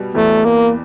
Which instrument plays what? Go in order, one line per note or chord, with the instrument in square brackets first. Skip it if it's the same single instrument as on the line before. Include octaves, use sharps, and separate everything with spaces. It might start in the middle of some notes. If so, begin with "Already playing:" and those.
Already playing: [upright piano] B2 G3
[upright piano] E2 [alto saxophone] A3
[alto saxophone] A#3